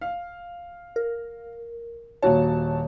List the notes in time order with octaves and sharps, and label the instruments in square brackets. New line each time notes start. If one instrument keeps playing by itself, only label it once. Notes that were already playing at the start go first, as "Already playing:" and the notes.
[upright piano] F5
[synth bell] A#4
[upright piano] D#1 F#4 A5 [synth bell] A#3 C#5